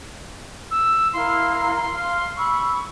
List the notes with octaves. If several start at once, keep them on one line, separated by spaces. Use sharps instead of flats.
E6
E4 A#4 F5 C6
F5 F6
B5 C#6 E6